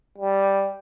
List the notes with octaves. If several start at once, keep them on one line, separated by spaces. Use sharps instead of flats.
G3